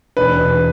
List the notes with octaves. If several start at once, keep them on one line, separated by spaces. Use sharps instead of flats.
E1 B4
E1